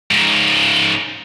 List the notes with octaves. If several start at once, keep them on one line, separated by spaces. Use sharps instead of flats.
G#2 C#3